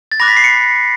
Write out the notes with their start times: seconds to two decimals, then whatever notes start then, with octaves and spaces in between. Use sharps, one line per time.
0.12 A6
0.20 B5 D6 F#6 A#6
0.28 B6
0.37 C7
0.44 C#7